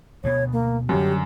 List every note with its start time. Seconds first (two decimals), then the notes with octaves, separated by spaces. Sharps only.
0.24 D2 B2 B3 C#5
0.53 A#3
0.89 F#2 D3 F#3 G3 G4